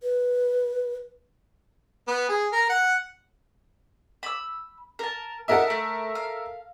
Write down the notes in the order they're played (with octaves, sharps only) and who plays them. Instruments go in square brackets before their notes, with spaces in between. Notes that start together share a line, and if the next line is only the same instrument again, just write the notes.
[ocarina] B4
[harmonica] B3
G#4
A#4
F#5
[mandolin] B5 E6
A#4 A5
[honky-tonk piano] A4 A#4 E5 [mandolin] D#5 F#5
[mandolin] A3
F5